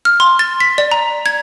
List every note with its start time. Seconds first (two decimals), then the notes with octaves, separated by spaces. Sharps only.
0.05 F6
0.20 C6
0.39 A6
0.60 B6
0.78 D5
0.92 A#5
1.26 G#6